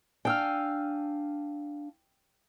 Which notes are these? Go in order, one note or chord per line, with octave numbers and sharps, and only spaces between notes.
D4 F5 G5 G#5 E6 F6